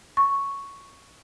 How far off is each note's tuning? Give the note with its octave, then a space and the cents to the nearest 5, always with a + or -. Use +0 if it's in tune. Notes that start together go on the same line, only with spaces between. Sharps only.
C#6 +0